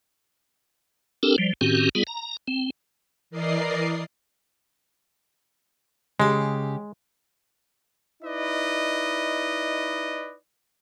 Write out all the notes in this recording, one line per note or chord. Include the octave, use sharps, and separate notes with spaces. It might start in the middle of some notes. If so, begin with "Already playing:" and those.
C4 D4 G4 A4 A#4
F3 G3
A2 D#3 C4 C#4 F#4 G4
G3 B3 F4 G#4
A#5
C4
E3 A#4 D5 D#5 C7
C#3 G#3 G4
D#4 E4 B4 D5 D#5